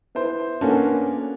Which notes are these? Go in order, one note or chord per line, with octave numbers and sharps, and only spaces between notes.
B3 E4 C5
A#3 B3 C#4 D4 F#4 A4